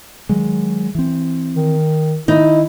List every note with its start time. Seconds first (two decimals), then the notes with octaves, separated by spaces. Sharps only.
0.29 D#3 F#3 G#3
0.95 E3 C4
1.55 D#3
2.28 D#3 D#4 E4